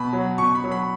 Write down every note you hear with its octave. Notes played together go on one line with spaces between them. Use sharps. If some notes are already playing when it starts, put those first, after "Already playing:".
Already playing: B2 B5
F#3
B2 C#6
B5
F#3
B5